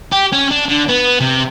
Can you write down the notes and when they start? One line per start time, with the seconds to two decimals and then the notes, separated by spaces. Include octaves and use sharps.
0.12 G4
0.32 C#4
0.51 D4
0.69 D3
0.88 B3
1.20 C3